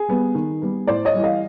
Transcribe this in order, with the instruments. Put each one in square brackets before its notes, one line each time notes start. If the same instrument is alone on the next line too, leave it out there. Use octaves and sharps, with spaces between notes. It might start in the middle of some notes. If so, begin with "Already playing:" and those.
Already playing: [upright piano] G#4
G3 B3
D#3
G3 B3
A2 C5 D5
C#5 D#5
E3 G3
D#5 F5